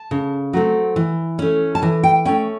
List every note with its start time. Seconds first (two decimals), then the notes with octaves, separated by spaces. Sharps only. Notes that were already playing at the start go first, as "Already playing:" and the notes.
Already playing: A5
0.11 C#3
0.53 F#3 A3 C4
0.96 E3
1.39 A3 C#4
1.75 A5
1.82 E3 G#5
2.03 G5
2.25 A3 C#4 G5